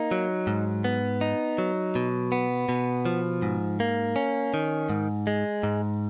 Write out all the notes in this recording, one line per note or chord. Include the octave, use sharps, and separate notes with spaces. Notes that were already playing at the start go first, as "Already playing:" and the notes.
Already playing: A#3 D#4
F#3
G#2
B3
D#4
F#3
B2
B3
B2
F3
G#2
A#3
C#4
D#3
G#2
G#3
G#2